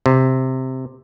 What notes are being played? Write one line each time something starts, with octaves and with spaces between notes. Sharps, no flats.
C3